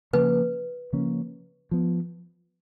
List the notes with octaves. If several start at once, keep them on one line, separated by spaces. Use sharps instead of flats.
C#3 F3 A#3 C#4 B4
C#3 F3 A#3 C#4
F3 B3